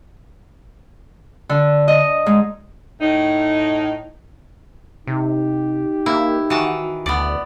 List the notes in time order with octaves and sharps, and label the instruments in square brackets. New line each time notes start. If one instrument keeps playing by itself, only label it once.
[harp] D3
D#5
G#2
[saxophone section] A2 D#4
[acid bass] C3 [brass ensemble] D#4 G4
[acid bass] A#3 [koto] E4
[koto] D#3 E3 A5 [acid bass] F#4
[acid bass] D2 [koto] B3 D5